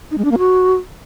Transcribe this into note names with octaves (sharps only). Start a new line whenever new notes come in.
D#4
G#3
D4
A#3
F#4